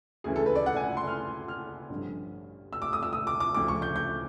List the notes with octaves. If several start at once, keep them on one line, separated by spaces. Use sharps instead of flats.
D2 C#3 E3 G#4
A4
B4
D5
F#5
G#5
C6
F6
F6
A1 G2 D3 F3
E6
D6
D#6
E6
D#6
D6
D6
D2 C#3 F3 D6
C#6
G6
G6